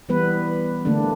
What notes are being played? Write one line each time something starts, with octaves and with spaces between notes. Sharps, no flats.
E3 G3 B3 B4
D3 A3 A#3 D4